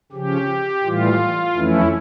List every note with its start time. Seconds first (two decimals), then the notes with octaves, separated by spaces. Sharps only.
0.12 C#3 F3 C#4 G4
0.84 A2 E3 G3 F4
1.56 F2 E3 A3 C#4 E4